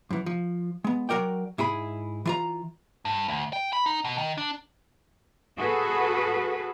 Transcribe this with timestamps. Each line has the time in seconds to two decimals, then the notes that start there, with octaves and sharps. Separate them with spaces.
0.11 F#2 E3
0.26 F3
0.84 G#3 B3
1.09 F#3 F#4 A#4 D5 G5
1.58 G#2 E4 G#4 B5
2.25 E3 F4 A#5
3.05 G2
3.28 D2
3.53 G5
3.73 B5
3.86 D#4
4.04 B2
4.18 D#3
4.38 D4
5.58 F#4 G#4 A4 B4